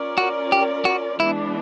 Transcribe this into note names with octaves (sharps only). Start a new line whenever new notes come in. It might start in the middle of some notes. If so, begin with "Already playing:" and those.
Already playing: C#4 F4 A#4 D5
F#4
G4
F#4
E3 G#3 B3 D4 E4